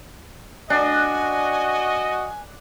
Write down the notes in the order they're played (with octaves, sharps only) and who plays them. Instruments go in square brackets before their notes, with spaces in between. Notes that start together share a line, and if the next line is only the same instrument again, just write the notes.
[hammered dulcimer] D4 [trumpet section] F#4 D#5 [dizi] G#5